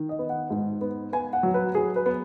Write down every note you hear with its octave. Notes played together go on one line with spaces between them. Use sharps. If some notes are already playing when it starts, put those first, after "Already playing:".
Already playing: D#3
D#5
B3
F#5
G#2
B3
B3 G#5
F#5
F#3
B4
F#3 G#4
B4
B3